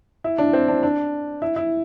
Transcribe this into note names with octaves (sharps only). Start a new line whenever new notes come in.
E4
D4
C4
D4
D4
E4
E4